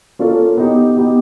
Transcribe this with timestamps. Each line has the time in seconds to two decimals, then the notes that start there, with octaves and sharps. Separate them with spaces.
0.19 A#3 C#4 F4 A4 C#5
0.57 B3 D#4 G4
0.97 B3 D#4 G4